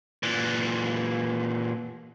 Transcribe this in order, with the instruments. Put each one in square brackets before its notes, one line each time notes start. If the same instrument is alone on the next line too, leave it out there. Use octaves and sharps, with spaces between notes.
[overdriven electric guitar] A#2 E3